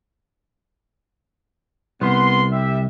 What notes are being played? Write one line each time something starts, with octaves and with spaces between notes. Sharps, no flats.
C2 B3 C6
G3 E5